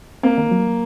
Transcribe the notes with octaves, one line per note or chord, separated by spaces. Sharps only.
A#3 C4
D#3
F#3